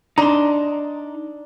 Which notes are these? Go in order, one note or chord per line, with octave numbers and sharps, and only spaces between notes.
D4 D#4 A#5 C6